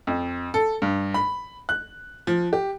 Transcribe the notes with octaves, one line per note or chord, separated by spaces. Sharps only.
F2
A4
G2
B5
F#6
F3
G4